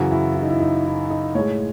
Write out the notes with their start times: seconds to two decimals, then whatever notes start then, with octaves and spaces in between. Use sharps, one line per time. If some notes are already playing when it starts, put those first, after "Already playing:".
Already playing: F#2 C#3 E3 F#4
0.11 E4
0.36 E4
0.42 D#4
0.50 E4
0.60 D#4
0.85 E4
1.10 D#4
1.35 A2 G#3 C#5